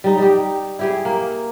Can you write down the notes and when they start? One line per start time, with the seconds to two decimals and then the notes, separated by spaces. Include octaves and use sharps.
0.04 G3 D#4
0.18 G3 G4
0.79 E4 G4 G#4
1.05 A#3